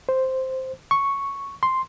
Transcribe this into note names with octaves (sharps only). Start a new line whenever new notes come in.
C5
C#6
C6